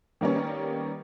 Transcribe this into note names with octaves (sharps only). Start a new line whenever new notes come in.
D#3 G3 A#3 B3 C#4